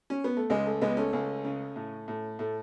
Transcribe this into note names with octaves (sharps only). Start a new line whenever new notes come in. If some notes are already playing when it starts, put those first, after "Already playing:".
C#4
B3
A3
C#2 G#3
A3
C#2 G#3 B3
A3 C#4
C#2
C#3
A2
A2
A2 A3